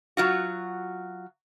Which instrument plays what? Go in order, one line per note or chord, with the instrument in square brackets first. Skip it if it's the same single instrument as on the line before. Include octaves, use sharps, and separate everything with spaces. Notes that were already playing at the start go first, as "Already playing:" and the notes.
[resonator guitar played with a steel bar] F#3 F4 F#4